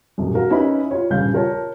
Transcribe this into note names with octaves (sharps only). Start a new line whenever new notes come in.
D#1 F#2
F#4 A#4 F5
C#4 D#4 E4 B4 B5
F4 C#5
D#1 G2 C#3 F5 G6
F4 A#4 C#5 A5